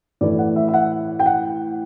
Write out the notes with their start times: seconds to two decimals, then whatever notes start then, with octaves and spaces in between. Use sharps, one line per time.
0.21 A2 E3 A3 D5
0.39 F#5
0.56 E5
0.68 E5
0.74 F#5
1.19 G5
1.26 F#5